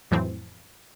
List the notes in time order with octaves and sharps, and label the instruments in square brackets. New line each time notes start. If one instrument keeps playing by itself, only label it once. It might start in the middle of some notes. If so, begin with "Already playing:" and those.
[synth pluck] F2 A2 E3 F#3 C4